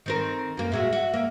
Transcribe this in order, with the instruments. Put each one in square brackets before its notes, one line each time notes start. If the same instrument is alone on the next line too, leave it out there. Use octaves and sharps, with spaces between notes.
[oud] D#3 C4 A#4
F#2 A#3
[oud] A#2 G#3 F#4 [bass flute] E5
[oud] F#4
A#3